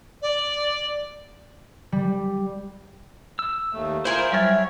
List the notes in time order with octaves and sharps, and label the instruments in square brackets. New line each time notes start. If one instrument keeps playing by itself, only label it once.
[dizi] D5
[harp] G3
[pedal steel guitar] E6
[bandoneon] D#2 A3
[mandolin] E4 G#4 A#4 [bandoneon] F4 [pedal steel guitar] C5
[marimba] F#3 G3 A6 [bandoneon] C#5 [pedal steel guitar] E5 F6